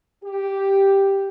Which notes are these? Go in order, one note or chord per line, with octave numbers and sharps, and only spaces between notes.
G4